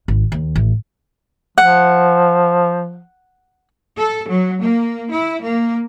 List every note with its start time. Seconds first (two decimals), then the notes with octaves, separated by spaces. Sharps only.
0.08 G#1
0.32 D#2
0.56 A1
1.58 F3 F#5
3.97 A4
4.28 F#3
4.60 A#3
5.11 E4
5.42 A#3